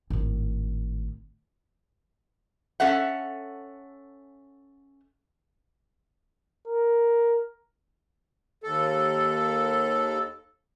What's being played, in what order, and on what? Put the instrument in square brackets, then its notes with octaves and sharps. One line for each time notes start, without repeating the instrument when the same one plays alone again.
[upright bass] G#1 A2
[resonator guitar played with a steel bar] C#4 A4 E5 F#5
[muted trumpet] A#4
[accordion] D#2 A4